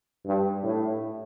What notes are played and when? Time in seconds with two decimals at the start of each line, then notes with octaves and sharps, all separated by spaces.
0.26 G2
0.63 A2